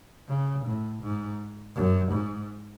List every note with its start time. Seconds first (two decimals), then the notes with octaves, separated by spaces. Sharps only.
0.29 C#3
0.65 A2
1.02 G#2
1.75 F#2
2.12 G#2